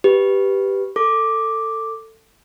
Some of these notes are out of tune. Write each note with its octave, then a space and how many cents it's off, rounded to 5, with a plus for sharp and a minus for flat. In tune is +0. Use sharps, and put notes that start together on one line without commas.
G4 +0 B4 +0
A4 +20 D6 +0